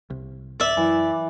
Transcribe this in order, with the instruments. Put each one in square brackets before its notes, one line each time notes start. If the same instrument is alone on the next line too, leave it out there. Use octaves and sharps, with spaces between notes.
[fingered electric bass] C2
[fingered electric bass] D1 [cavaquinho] D5 E5
[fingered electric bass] F#2 [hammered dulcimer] E3